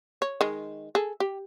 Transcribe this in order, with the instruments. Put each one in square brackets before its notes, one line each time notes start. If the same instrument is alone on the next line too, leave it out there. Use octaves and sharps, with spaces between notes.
[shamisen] C#5
D#3 G#3
G#4 A4
G4